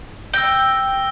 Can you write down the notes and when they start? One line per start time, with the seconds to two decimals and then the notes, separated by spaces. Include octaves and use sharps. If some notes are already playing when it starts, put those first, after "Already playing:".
0.33 G5 E6 A#6 G7